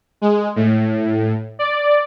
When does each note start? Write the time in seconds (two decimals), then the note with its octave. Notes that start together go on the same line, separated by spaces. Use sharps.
0.21 G#3
0.56 A2
1.59 D5